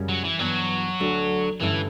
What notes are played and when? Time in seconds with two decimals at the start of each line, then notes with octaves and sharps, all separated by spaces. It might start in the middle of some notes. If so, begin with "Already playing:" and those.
Already playing: F#2 C#3 G3 C#4
0.09 F#3
0.24 E3
0.39 G2 E3 F#3 B3
1.00 D2 D3 A3 D4 F#4
1.60 G2 D3 E3 A3 C#4 E4